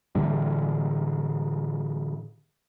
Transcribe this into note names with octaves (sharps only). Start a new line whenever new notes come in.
A2 D3 E3 G3